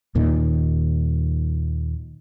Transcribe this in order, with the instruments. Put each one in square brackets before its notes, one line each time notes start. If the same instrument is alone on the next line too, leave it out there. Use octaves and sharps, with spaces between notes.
[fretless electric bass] D#2 A#2 D#3